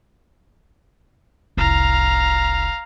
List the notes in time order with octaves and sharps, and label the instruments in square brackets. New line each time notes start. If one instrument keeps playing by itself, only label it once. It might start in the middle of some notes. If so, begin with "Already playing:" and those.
[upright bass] F1 C2 [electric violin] F5 A#5